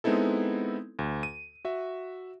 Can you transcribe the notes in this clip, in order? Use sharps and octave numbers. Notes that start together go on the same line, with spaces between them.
G#3 B3 C4 D#4 E4 A4
D2
D#7
F#4 E5